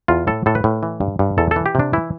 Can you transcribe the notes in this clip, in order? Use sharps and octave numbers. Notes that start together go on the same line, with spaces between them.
E2 F4
A2 A4
A2 A4
B4
A2
E3
G2
G2
E2 A4
E3 A4
G4
C3 D4
E3 E4